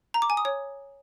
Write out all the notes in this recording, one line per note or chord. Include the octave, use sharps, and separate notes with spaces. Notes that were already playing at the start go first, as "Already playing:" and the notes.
A#5
D6
G#5
D#6
C#5